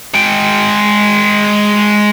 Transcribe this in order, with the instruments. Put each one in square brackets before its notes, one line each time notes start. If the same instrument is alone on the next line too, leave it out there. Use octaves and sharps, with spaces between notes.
[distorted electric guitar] G#3 G5